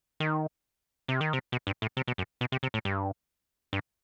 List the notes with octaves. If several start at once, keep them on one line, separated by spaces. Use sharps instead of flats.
D#3
C3
D#3
C3
B2
G2
A2
C3
B2
F#2
B2
C3
C3
A2
G2
G2